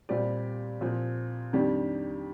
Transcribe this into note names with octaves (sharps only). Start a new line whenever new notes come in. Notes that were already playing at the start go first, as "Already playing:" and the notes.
A#2 G3 C4 G4 D5
A#2 F3 C4
F2 D#3 G3 D4 G4